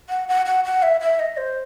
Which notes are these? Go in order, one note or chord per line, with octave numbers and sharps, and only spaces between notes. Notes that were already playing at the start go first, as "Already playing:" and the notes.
F#5
F#5
F#5
F#5
E5
E5
D#5
C5